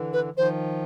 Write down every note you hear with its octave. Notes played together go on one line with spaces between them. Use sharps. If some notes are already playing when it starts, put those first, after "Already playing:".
Already playing: D3 E3
B4
D#3 F3 C5